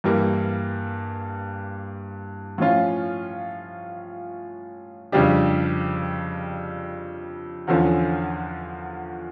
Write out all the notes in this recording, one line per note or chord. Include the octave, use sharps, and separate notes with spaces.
G2 E3 G3 A#3
A2 F3 C#4 F4
F2 C#3 G3 D4 G4
E2 D3 F3 C#4